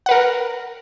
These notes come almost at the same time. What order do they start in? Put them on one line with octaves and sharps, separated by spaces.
F#5 B4 A#4